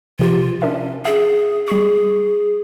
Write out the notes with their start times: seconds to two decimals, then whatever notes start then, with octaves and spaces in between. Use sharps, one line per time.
0.19 C3 F3 F4 G4
0.62 C#4 D4 A#4 E5
1.05 G#4 E5
1.68 G3 G#4 C#6